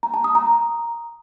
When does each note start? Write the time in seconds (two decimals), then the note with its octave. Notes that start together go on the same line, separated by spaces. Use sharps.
0.03 A#5
0.14 A5
0.24 D#6
0.35 A#5